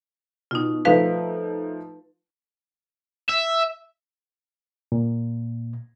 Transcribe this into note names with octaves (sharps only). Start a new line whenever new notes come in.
B2 D#4 F4
F3 A3 D#4 B4 F5
E5
A#2